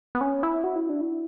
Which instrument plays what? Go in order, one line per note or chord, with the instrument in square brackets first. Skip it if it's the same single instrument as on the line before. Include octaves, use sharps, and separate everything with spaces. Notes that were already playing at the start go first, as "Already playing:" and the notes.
[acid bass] B3
C#4
E4
F#4
E4
D4
E4